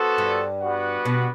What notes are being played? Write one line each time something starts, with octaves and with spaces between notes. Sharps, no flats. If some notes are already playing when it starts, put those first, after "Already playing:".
Already playing: B3 F#4 A4 C5
G2
G3 B3 F#4 B4 F#5
B2